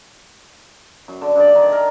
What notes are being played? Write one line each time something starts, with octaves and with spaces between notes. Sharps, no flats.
F#2
D3
G2 D5
D#3
A#4